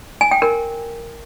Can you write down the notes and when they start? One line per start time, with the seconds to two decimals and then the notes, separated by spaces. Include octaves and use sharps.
0.21 G#5
0.31 G5
0.42 A#4